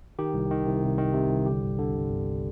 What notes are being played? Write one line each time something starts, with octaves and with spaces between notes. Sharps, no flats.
D#3 G4
C2
D#3
C2
C3
D#3
C3
C2
D3 G4
G1
D3
G1
G1